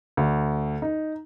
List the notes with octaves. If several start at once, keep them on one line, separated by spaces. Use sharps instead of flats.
D2
D#4